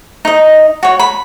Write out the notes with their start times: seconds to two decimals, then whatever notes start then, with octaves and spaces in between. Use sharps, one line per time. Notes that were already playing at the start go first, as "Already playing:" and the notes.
0.25 D#4 D#5
0.83 F#4 C#5
0.99 B5